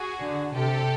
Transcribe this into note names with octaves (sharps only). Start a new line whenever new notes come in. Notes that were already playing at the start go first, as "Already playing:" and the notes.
Already playing: F#4 G#4
D3
C3 G4 A4